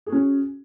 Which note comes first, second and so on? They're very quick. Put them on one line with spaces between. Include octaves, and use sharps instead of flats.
G#4 F#4 C#4